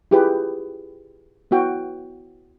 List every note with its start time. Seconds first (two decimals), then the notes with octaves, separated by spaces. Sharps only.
0.11 E4 F4 G4 G#4 B4
1.51 B3 E4 F#4 G5